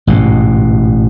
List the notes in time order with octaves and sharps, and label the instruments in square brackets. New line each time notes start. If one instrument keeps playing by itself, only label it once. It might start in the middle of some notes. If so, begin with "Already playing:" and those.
[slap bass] A1 G#2 B2